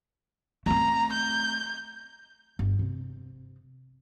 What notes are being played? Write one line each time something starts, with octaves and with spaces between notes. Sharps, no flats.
A3 C4 A#5
G6
G1
C3